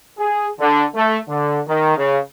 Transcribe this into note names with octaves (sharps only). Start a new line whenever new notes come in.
G#4
D3
A3
D3
D#3
C#3